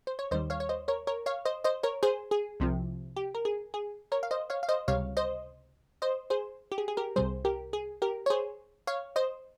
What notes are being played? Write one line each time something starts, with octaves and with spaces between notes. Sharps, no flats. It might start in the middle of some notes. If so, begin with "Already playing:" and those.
C5
C#5
D#2 D#3 G3 C5 D#5
C#5 F5
C#5
C5 D#5
A#4 C#5
A#4 C#5
C#5 F5
C5 D#5
C5 D#5
A#4 C#5
G#4 C5
G#4
C2 C3 F3
G4
A#4
G#4
G#4
A#4 C#5
F5
C5 D#5
C#5 F5
F5
C5 D#5
C#2 C3 G3 C#5 F5
C5 D#5
C5 D#5
G#4 C5
G4
G#4
G#4
G4 A#4
C2 C3 G3 G#4 C5
G4 A#4
G#4
G4 A#4
C#5
G#4 C5
C#5 F5
C5 D#5